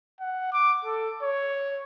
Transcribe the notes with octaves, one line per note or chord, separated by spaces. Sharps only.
F#5
D6
A4
C#5